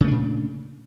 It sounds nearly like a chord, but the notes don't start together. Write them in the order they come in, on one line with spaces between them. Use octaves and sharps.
C#3 A3 D4 A#2